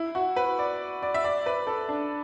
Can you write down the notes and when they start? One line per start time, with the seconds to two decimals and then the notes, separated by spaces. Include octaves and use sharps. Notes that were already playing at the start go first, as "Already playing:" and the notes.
Already playing: E4
0.15 F#4
0.36 B4
0.59 D5
1.03 D5
1.14 E5
1.24 D5
1.46 B4
1.67 A4
1.89 D4